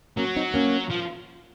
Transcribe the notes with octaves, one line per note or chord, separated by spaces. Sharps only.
F#3 A#3 C#4
C4 D#4
A#3 C#4
F3